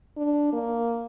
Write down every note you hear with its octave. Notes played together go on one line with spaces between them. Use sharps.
D4
A#3